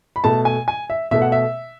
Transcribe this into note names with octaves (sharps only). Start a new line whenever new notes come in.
B5
B2 A3 A5
G#5
G#5
E5
B2 A3 E5
F#5
E5